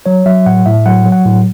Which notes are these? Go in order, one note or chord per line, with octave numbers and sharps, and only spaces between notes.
F#3 C#5
F#3 E5
A2 F#5
A2 E5
F#3 F#5
F#3
F#5
A2